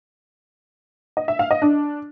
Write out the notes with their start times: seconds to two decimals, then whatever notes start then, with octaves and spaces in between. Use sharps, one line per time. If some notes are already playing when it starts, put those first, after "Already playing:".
1.17 D#5
1.28 E5
1.39 F5
1.51 D#5
1.62 D4